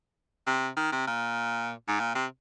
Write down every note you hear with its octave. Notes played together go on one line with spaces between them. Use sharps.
C3
D#3
C3
A#2
G#2
A#2
C3